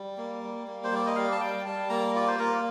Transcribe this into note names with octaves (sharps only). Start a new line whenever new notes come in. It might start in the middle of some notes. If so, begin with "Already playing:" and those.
Already playing: G3
A#3
G3
A#3
C5
G3 D5
D#5
G3 F5
A5
G3 G5
G3 A5
A#3 A#5
F4 D5
C5
A#3 A#4